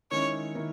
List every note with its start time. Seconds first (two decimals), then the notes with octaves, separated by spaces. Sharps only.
0.11 D#3 G#3 C#4 E4 C#5
0.55 D#3 A#3 E4